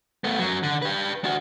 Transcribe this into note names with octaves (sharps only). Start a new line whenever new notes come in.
A3 B3
F#2 F#3
D3
G4 B4
D4 F#4